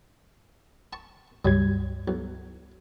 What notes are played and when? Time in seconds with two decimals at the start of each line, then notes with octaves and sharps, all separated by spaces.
0.93 A5 C#6
1.45 C#2 G2 F#3 G3 G#6
2.08 B1